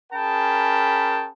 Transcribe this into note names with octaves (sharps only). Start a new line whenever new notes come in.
C#4 G#4 A#4 G5 A5 B5